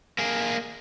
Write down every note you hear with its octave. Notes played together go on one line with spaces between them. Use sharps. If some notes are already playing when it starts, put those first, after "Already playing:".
A#3 G#4